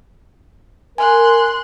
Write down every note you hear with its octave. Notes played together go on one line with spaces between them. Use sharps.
A#4 G#5 C6 F#6